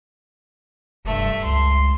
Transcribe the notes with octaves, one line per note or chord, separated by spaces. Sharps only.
F1 G2 A3 E5
C#2 C6